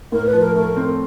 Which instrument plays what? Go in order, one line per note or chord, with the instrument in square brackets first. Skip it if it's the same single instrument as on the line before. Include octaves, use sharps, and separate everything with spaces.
[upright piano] A2 [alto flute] A#4
[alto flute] B4
[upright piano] F3
[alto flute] A#4
[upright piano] A3 [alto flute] A#4
[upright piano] C4